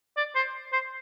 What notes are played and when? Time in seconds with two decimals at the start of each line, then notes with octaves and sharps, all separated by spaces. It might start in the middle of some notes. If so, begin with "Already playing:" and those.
0.17 D5
0.35 C5
0.73 C5